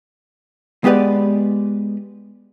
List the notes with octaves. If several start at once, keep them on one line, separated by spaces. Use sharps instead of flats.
G#3 B3 G4 B4 D5